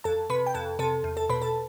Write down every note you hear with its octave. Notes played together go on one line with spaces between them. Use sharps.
F2 A4 A5
C3 B4 B5
G5
F2 A4 A5
C3 A4 A5
E2
A4 A5
B2 B4 B5
A4 A5